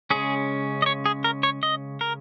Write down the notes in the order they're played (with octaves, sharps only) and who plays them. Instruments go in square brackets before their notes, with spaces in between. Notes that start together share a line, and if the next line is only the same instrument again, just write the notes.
[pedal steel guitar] C#3 G#3 C#4 G#4
D#5
C#5
G#4
A#4
C#5
D#5
A#4